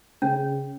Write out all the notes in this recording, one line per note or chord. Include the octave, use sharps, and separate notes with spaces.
C#3 C#4